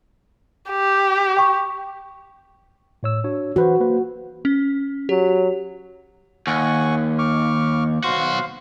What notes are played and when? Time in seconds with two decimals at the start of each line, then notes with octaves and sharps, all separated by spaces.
0.70 G4
1.37 G5 C#6
3.03 A2 C#5 E6
3.24 D4 F#4 C#5
3.56 E3 F#4 B4 C5
3.80 A#3 B4 C5
4.45 C#4
5.09 F#3 G4
6.47 D#2 F#5 G#5 C#6
7.18 C#6 D6 F6
8.04 B1 F#4 C5 F5